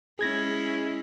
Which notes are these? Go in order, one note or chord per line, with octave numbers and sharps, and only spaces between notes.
G#3 C#4 E4 G#4 G#6 A#6